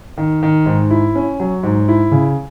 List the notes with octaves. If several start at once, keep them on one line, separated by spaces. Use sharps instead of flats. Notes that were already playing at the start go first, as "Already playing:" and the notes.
D#3
D#3
G#2
E4
C#4
F#3
G#2
E4
C#3